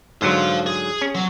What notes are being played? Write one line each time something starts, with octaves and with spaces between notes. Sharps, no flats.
G#2 D3 F#3 C5 F5
G#4
C#4
F#3